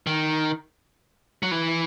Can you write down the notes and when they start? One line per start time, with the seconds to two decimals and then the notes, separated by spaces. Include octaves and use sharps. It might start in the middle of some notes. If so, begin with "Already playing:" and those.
0.07 D#3
1.43 F#3
1.51 E3